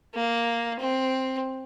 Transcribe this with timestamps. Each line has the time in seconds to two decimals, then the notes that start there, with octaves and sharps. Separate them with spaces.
0.14 A#3
0.79 C4